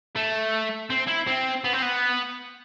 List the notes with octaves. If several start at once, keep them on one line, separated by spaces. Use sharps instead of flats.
A3
C4
E4
C4
B3
C4
B3